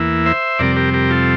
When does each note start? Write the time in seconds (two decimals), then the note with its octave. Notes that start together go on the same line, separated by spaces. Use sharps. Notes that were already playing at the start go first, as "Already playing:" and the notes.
Already playing: E2 E3 A#3 E4
0.26 C5 E5
0.59 F2 C3 G3 C4 A#4 D5
0.76 G4 A#4
0.94 G4 A#4
1.10 F4 A4